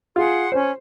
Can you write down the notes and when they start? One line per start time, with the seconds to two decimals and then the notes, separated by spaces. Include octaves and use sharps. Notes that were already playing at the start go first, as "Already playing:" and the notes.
0.16 F4 G#4 F#5 C6
0.52 C#4 C5